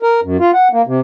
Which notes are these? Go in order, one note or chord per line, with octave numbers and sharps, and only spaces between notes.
A#4
F#2
F4
F#5
A#3
C3